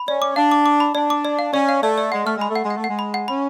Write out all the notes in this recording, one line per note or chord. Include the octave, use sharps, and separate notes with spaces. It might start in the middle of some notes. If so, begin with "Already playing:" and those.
Already playing: B5
C#4 D5
D6
D4 F5
D6
D6
B5
D4 D5
D6
D5
F5
C#4 D5
F5
A3 D5
D5
G#3 F#5
A3 F6
G#3 B5
A3
F#5
G#3
F#5
A3
G#3 F#5
B5
F#5
C#4 B5